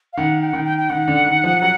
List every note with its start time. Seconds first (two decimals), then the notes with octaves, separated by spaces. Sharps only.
0.13 F5
0.17 D#3 F#5
0.42 G5
0.48 F#5
0.53 D#3 G5
0.65 G5
0.78 G5
0.90 D#3 F#5
1.08 D3
1.26 D#3
1.44 F3
1.62 F#3